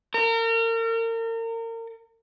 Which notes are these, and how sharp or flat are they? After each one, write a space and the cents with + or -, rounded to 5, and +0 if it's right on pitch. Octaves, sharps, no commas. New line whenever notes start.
A#4 -35